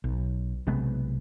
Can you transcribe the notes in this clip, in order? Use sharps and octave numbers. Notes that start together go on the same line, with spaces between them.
B1
B1 C3 G#3 B3